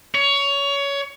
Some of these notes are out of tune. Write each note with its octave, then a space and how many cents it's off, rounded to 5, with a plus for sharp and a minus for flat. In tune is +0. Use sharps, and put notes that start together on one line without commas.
C#5 +20